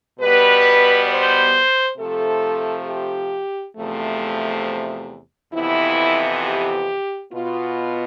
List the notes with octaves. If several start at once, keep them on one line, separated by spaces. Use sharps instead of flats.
B2 G3 B3 B4
C5
C3 F3 A3 A4
G4
E2 C3 F3 A3
F2 C3 E3 B3 E4
G4
B2 B3 F4